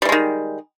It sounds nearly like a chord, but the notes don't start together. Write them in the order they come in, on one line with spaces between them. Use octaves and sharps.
G3 E3 G#3 D#3